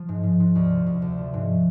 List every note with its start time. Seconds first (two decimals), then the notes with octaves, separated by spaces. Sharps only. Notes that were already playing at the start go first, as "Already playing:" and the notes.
Already playing: F3
0.09 G#2
0.23 G#2
0.40 G#2
0.55 D2
0.70 C3
0.86 D2
1.02 D2
1.18 F3
1.34 G#2